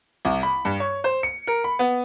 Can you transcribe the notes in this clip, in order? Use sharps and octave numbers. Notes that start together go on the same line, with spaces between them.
C2
B5
G2
C#5
C5
C#7
A#4
B5
B3